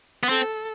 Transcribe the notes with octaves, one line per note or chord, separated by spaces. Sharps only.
B3
C4 A4